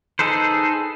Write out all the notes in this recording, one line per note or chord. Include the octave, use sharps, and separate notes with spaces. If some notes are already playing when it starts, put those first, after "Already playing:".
D#4 G#4 A4 B4 C5